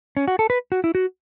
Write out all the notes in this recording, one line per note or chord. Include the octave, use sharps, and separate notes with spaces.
C#4
F#4
A4
B4
F#4
E4
F#4